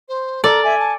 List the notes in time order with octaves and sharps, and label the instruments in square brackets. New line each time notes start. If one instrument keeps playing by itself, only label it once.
[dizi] C5
[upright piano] A4 [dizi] A#4 [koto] D5
[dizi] E5 [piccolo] G#5
[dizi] A5